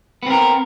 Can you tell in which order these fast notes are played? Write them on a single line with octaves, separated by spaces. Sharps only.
B3 C4 A#4